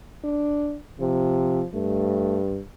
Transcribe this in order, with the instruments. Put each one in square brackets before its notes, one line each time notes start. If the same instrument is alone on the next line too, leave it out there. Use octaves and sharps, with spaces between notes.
[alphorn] D4
[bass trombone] C3 [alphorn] F3
[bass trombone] G2 [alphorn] A3